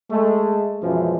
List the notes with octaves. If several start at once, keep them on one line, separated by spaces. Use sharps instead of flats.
G#3 A3
F#2 B2 E3 F3 G#3